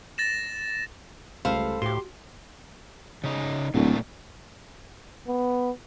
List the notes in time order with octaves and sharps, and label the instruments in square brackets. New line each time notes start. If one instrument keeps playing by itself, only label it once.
[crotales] A6 A#6 E7
[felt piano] C#2 G3 A3 [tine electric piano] A4 B5 [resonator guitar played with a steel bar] C5 F5
[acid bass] A2 [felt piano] F#4 [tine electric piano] G4 C6
[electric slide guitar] C#3 D#4
[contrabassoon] D1 [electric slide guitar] A#2 F#3 A3
[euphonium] B3